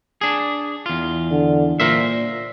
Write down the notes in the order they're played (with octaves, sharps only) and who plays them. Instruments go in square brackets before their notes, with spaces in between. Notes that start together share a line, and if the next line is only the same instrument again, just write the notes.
[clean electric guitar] D4 G#4
E2 F4
[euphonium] D3
[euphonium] A#2 [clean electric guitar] A#4 C5 E5